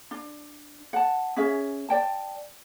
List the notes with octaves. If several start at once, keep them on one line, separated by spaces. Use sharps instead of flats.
D4
F#5 A5
C#4 G#4 E5
D5 G5 A5